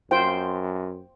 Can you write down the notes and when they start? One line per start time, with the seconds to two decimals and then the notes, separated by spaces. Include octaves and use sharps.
0.11 F#2 F4 C5 G5